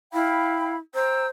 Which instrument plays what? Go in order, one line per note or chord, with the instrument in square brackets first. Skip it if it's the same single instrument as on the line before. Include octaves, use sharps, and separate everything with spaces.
[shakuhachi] E4 [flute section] F5 G5 B5
[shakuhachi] C5 [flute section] G5 A#5 E6